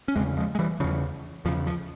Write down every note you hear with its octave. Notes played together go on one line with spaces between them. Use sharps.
C#4
E2 C#3 G#3 C4
F3 G#3
G#3
E3 G3
E2 C#3 F3
E2 C#3 F3
F3